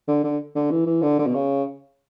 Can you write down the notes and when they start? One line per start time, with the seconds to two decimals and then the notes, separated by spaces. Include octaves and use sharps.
0.08 D3
0.23 D3
0.56 D3
0.71 E3
0.86 E3
1.02 D3
1.19 D3
1.27 B2
1.35 C#3